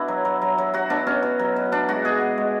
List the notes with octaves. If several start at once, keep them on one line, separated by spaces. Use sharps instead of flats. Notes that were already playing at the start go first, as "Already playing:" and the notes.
Already playing: B2 D4 E4 F#4
F#3
F#3
F#3
F#3
F#3 F#4
B2 D4
B2 C#4
B2
F#3
B2
B2 D4
G#3 F#4
B2 G#4
B2
G#3